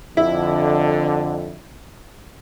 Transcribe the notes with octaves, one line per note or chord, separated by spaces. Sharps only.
F2 D3 E4